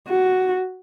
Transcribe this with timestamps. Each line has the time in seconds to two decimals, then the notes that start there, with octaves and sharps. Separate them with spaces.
0.08 F#4